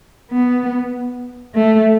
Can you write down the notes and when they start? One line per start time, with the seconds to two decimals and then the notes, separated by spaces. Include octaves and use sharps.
0.31 B3
1.55 A3